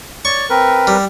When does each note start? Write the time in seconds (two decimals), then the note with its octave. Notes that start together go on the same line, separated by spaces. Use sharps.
0.25 C#5 D5 C#6
0.50 C4 A#4 B4
0.87 G3